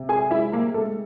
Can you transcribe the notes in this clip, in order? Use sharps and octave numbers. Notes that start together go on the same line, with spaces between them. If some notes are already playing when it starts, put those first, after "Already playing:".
Already playing: C3
G#4 G#5
G#3 E4 E5
A#3 A#4
G#2 A3 A4